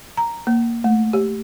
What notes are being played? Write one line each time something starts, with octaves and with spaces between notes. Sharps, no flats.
A#5
A#3
A3
G4